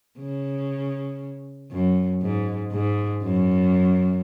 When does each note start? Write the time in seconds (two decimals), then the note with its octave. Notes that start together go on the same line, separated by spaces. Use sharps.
0.19 C#3
1.71 F#2
2.22 G#2
2.72 G#2
3.23 F#2